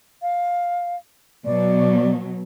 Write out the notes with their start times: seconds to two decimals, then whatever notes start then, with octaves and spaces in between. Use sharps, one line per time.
0.22 F5
1.45 B2 F#3 D5